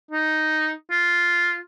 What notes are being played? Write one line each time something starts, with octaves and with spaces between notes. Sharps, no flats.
D#4
F4